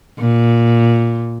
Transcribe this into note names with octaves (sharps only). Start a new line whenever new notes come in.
A#2